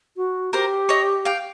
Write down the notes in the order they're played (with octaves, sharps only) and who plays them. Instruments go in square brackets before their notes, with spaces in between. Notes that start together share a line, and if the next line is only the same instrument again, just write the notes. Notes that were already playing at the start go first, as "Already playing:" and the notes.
[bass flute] F#4
[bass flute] G4 [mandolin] A#4 C5
[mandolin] C#5 D#5
F5 G5